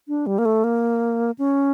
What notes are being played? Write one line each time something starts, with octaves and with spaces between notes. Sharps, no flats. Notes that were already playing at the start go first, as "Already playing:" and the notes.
D4
G3
A#3
A3
A#3
C#4